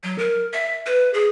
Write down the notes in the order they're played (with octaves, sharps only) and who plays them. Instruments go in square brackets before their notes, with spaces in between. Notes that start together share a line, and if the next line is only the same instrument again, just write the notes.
[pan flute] F#3
A#4
E5
B4
G#4